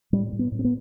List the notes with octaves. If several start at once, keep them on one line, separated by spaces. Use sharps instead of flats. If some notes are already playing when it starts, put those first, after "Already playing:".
A2 G3
A2
B3
A2
C4
B3